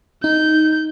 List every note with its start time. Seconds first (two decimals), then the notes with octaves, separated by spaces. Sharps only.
0.24 D#4 G6